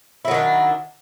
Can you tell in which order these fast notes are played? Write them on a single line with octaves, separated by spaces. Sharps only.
E4 F#3 D#3 D4